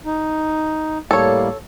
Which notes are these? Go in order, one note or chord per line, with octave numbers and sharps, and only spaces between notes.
D#4
A2 G3 A#3 A4 C#5